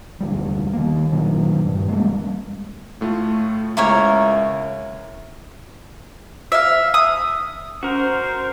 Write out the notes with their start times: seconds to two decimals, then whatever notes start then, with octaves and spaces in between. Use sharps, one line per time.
0.20 F1 D2 G3
0.73 D#3 A#3
1.12 A#2 D#3 F#3
1.65 G2
1.88 G3 G#3 A#3 C#4
3.01 A2 A3 F4
3.77 C#2 E4 A#4 C#5
6.52 E5 F5
6.94 D#6
7.83 C#4 F#4 A#4 C5